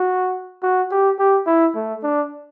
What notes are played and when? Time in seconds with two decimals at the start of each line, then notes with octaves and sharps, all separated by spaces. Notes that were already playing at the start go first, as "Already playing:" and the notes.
Already playing: F#4
0.63 F#4
0.91 G4
1.20 G4
1.47 E4
1.75 A3
2.03 D4